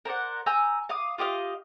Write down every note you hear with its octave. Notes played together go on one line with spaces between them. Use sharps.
A#4 C5 D5 F#5
G#5 A#5 E6 G6
F5 D6 D#6
F4 G4 D#5 F5